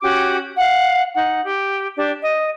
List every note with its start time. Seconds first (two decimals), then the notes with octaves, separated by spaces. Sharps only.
0.01 C#4 F#4 G4 D6
0.58 F5 F#5
1.13 D#4 F#5
1.43 G4
1.96 D4 G4
2.21 D#5